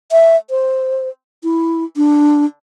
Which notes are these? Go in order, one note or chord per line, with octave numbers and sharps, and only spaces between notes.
E5
C5
E4
D4